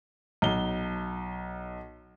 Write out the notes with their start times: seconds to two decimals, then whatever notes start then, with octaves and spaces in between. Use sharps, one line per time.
0.42 B1 G7